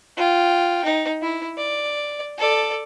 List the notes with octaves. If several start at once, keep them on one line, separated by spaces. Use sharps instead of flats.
F4 G5
D#4
E4
D5
A4 D5